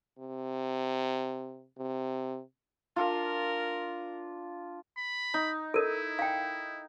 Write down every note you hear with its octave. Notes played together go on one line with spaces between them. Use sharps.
C3
C3
D4 F4 A#4
B5
D#4
E4 A4 A#4
F5 G5